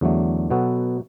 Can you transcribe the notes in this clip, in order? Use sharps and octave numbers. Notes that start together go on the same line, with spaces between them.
E2 D3 F#3 A3
B2 F#3 B3 F#4 A4